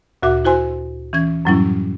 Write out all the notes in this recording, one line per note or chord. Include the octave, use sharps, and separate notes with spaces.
D2 A#2 F#4 E5 D6
E4 F#4 C5 G#5 C6
E3 C#4 G#6
F#2 A2 F#3 G3 C#4 E4